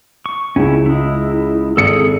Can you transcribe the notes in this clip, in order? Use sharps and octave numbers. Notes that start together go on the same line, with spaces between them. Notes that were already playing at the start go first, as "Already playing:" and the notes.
C#6
C#2 C#4 E4
G#3 E4
G#1 G#4 A4 C#7